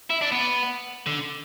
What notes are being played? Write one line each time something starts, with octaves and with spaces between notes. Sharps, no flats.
E4
D4
B3
D3